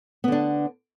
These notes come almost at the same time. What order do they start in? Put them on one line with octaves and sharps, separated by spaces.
B3 D3 D4